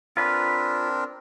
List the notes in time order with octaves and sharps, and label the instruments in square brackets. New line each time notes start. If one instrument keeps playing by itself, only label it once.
[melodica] C4 D4 A#4 [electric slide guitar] F4 B4